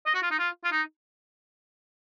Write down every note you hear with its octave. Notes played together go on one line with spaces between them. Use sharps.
D#5
F#4
F4
D#4
F4
F4
D#4